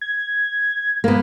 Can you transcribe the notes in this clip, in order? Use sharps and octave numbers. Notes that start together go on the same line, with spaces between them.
G#6
A#3 B3